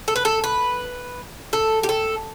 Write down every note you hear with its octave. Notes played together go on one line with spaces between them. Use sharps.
A4
B4
A4
B4
A4
G4
A4